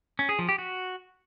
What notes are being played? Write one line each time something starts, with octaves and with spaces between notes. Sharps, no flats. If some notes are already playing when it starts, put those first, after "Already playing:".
C#4
G#4
F3
G4
F#4